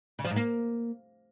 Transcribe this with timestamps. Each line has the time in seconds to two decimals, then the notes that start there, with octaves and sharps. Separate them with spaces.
0.19 C#3
0.25 F3
0.30 G#2
0.36 A#3